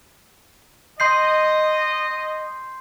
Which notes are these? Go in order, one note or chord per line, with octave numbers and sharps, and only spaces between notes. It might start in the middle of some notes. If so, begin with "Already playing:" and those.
D#5 C6 G6 C7